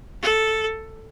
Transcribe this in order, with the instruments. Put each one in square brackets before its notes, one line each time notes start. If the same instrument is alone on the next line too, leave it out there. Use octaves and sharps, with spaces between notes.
[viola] A4